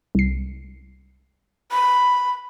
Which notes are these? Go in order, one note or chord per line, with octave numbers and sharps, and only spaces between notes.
C2 C7
B5